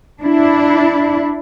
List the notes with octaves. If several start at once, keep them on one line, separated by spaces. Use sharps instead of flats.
D4 E4